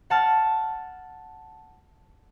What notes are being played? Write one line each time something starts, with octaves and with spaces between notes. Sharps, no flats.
F#5 A5 F6